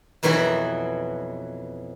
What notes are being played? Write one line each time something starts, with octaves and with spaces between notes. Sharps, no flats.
F2 B2 E3 F#3 F#4 C6